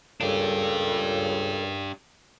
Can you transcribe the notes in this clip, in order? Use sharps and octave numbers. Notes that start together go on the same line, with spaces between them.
C#2 A#2 C#3 D4 G4 A4